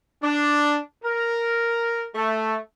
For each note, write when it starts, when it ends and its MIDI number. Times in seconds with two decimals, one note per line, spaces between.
0.23 0.78 62
1.05 2.07 70
2.15 2.56 57